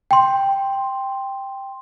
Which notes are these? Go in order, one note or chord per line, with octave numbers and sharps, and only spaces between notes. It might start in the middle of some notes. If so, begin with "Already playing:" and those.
G5 C6